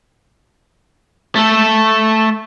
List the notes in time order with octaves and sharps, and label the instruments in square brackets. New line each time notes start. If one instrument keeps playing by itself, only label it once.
[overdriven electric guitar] A3 A4